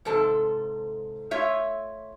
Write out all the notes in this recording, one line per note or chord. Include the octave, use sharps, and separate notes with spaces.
G#2 C3 A4 A5
A3 F4 C#5 E5